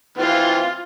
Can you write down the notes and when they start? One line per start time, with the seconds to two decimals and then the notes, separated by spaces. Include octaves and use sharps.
0.18 E3 C4 F4